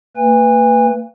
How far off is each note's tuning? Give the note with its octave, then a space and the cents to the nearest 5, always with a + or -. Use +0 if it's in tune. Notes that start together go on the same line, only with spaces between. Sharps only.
A#3 -40 B4 +0 G#5 -35